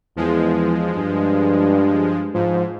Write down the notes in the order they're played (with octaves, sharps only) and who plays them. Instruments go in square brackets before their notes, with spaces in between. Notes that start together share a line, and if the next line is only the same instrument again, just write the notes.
[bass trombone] E2 [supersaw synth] F3 G#3
[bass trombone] G2
[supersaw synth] G#2 [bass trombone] F3